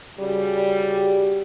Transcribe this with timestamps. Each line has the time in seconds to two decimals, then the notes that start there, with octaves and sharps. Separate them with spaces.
0.20 C#3 G3 F#4 G4